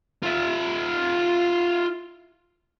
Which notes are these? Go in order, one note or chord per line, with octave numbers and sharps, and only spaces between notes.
F4 E5